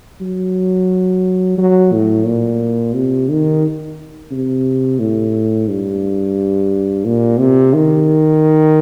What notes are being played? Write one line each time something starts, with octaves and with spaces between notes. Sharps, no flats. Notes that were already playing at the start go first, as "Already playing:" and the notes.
F#3
F#3
A2
A#2
C3
D#3
C3
A2
G2
A#2
C3
D#3